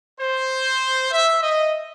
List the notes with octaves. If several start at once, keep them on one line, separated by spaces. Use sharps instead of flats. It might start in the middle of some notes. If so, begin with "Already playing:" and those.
C5
E5
D#5